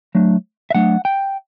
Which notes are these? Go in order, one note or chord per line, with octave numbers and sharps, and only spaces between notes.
F#3 A3 D4
E5
F#3 A3 D4 F#5
G5